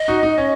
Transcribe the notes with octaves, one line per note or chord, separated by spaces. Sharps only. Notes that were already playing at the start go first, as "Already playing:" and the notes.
Already playing: D#5
D#4 F#4
D#4
C#4